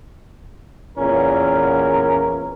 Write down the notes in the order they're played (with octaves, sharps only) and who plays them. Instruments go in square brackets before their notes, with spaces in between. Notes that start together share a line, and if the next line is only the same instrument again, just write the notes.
[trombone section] E2 A#2 C#4 A#4